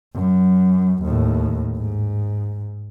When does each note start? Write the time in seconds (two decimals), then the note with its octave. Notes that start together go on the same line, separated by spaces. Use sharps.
0.14 F#2
1.03 D#2 A2
1.77 G#2